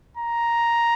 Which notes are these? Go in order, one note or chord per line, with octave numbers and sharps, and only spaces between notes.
A#5